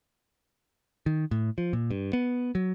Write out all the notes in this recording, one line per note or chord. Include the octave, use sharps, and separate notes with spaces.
D#3
A2
F3
A#2
G2
B3
F#3